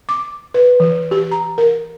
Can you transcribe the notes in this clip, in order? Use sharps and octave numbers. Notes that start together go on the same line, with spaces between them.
D6
B4
E3
G4
A#5
A#4